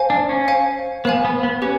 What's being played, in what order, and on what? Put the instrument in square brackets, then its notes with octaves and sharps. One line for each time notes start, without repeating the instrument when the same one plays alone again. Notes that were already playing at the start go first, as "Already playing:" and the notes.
Already playing: [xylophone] C5 F5 G#5
[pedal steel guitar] D4
C#4
[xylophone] C5 F5 G#5
[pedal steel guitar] B3 [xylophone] C5 F5 G#5
[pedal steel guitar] B3
B3
[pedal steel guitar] C#4 [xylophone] G4 B4